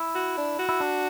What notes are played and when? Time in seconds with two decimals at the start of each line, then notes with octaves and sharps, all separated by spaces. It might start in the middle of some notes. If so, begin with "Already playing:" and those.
Already playing: E4
0.15 F#4
0.38 D4
0.59 F#4
0.69 E4
0.80 D4